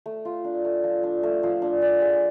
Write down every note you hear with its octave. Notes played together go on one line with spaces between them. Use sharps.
A3
F4
D4
A3
F3
D4
A3
F3
D4
D5
G#4